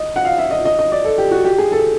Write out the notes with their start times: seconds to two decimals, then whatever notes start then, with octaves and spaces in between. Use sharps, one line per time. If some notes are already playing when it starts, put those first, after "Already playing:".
Already playing: D#5
0.16 F#5
0.25 F5
0.38 E5
0.51 D#5
0.65 D#5
0.79 D#5
0.92 D5
1.04 A4
1.18 G4
1.31 F#4
1.45 G4
1.58 G#4
1.72 A4